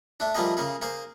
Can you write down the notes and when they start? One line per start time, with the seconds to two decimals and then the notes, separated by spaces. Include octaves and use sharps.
0.20 A3 D4
0.35 F3 G3 A3 A#3 G#4 D#5
0.57 C#3 A#3 G#4
0.82 A#3 G#4 C5